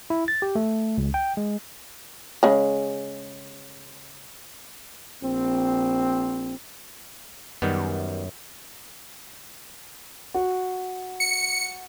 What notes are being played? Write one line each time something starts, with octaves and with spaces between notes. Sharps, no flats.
E4
A6
G4
A3
C#2
G5
G#3
C#3 G#3
A#1 C4
F#2 D#3 G3 B3
F#4
C#7